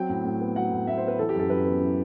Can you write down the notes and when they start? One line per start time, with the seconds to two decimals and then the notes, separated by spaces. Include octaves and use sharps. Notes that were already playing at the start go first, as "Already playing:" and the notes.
Already playing: F#3 C4 G5
0.09 A2
0.25 A2
0.41 B3
0.56 F#3 F#5
0.72 A2
0.87 A2 E5
0.97 C5
1.03 B3 B4
1.19 E3 A4
1.29 G4
1.35 F#2 A4
1.50 F#2 B4
1.66 B3
1.81 E3